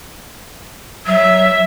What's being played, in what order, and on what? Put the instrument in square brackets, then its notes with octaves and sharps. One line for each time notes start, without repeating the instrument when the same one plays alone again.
[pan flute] F#3 [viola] E5